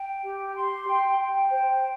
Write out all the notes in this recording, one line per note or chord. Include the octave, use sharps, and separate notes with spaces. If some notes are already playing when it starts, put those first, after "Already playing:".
Already playing: G5
G4
C6
G5
G5
C5